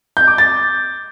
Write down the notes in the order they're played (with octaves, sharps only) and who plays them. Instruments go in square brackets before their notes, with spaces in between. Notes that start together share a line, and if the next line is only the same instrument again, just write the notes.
[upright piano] G6
D6
A6